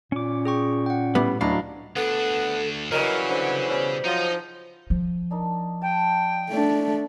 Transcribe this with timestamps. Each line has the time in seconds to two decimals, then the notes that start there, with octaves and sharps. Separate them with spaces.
0.12 A#2 C#4 D6
0.45 G#4 G5 C#6
0.86 F#5 G5
1.15 A2 G3 B3
1.41 D2 A2 F#3 D4 D#5 F5 A#5 B5
1.96 D2 B3 D4 A4
2.92 C#3 E3 F#3 G3 A#4 D#5
3.29 D3 C5
3.69 B2 E3 G3 C#4
4.05 F3 F#3 D#4 D#5
4.90 F3
5.31 D4 D#4 A#4
5.82 G5 A5
6.50 A3 D4